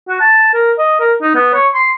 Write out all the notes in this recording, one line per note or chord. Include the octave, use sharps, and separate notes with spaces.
F#4
A5
A#4
D#5
A#4
D#4
B3
C#5
C6